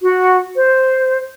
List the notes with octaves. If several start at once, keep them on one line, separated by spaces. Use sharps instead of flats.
F#4
C5